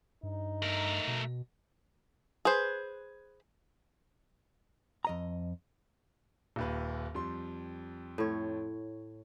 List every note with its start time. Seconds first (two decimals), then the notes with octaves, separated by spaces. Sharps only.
0.23 G2 D#4
0.62 A3 A#4
1.07 B2
2.45 G#4 B4 C5
5.05 F2 D#5 A#5
6.56 D#1 D#2 B4
7.15 F2 G3 C6
8.18 A2 C#5